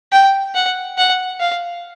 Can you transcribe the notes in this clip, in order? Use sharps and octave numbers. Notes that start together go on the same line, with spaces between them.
G5
F#5
F#5
F5